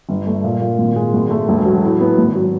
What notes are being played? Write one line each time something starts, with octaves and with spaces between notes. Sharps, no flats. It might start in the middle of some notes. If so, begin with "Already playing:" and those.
G1
A3
A#2
A#2
G#1
G#3
G#1
A3
E1
F#3
A2
B3
G#1
F#3